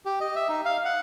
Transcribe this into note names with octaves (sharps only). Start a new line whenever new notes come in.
G4
D#5
E5
D#4
F5
F#5